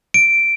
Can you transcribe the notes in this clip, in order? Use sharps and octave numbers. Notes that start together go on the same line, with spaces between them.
D7